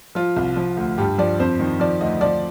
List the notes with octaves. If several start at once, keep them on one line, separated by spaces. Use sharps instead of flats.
F3 F4
C2
F3
D2
G2 G4
F3 D5
F2 C5
D#3
F3 D5
D2 D#5
F3 D5